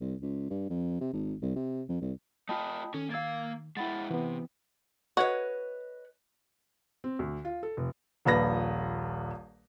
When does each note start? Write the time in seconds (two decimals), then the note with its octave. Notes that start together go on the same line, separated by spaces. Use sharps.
0.01 C2
0.22 C#2
0.50 G2
0.70 F2
1.01 C3
1.13 G#1
1.42 C2
1.56 C3
1.89 F2
2.02 C2
2.49 A3 F4 D#5 G5 A5 B5 D#6
2.94 D#3 C#4 A4
3.10 A#3 F5 E6 G#6 A6
3.77 G#3 E4 F#5 G5 B5 A6
4.11 C3 E3 B3
5.17 F#4 B4 C#5 D#5
7.04 C4
7.19 D2
7.45 F4
7.63 A4
7.77 F1
8.25 D#1 A#1 B4 A#6